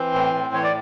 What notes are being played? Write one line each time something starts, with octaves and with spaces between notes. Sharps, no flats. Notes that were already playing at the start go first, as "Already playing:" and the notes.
Already playing: E3 C4 C5
A2
A2
E3 C#5
D5